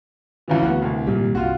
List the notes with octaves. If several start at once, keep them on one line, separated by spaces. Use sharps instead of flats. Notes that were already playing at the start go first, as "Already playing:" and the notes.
E2 C#3 E3
D2 B3 F#4
C2
G#1 A#2 G3
C2 G2 F4 F#4